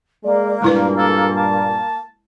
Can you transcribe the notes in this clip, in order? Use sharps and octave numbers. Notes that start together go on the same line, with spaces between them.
G#3 A#3 D5
G2 A#2 G#3 E4 B4
A4
A5